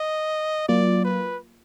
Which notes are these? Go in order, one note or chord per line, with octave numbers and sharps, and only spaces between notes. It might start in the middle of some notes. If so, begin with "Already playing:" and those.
Already playing: D#5
F#3 A#3 F4 D5
B4